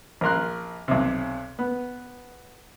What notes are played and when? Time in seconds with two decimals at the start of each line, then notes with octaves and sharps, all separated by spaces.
0.21 A#1 A#3 A#4 C6 F#6
0.88 B1 C3
1.59 B3